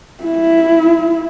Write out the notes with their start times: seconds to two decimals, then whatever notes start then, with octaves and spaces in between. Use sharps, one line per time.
0.24 E4